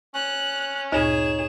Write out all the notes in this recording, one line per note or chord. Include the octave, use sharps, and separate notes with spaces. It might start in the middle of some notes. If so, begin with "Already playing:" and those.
C#4 F#6
D2 G2 A#2 D#4 G#4 C#5 E7